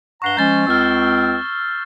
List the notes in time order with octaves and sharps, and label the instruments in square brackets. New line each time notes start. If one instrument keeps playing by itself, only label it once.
[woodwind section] G2 F#5 A#5 [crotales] C#6 C7 G7
[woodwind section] F3 G#3 C#4 [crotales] G6 A6 G7
[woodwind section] C#2 C4 [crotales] E6 F6